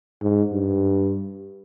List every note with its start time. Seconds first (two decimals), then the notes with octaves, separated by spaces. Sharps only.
0.22 G#2
0.53 G2